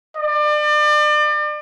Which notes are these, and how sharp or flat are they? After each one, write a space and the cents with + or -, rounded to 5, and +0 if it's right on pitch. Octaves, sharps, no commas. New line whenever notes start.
D5 +35